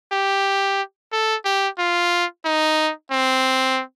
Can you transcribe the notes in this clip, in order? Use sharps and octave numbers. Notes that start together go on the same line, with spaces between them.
G4
A4
G4
F4
D#4
C4